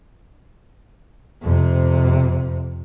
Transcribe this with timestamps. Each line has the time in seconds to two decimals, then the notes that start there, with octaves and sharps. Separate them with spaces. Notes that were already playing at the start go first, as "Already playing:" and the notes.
1.42 F2 C3